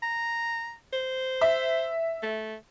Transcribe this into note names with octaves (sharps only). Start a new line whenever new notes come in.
A#5
C5
E5
A3